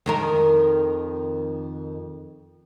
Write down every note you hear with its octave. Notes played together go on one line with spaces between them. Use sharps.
F2 D#3 A#4